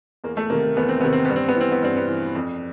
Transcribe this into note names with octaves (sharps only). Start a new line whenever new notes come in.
E2 A#3
A3
C3 D#3 A#3
A#3
E2 B3
C4
C3 D#3 B3
C4
G2 B3
C4
B3
E3 C4
B3
G2 C4
B3
E3
F2